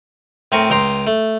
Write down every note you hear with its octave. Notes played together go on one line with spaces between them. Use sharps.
A2 C4 A#4 G#5 C#6
C#2 G5 A#5 C6
A3